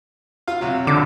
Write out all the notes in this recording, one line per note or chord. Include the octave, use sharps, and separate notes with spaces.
F4 F5
C3 F#3
D3 D6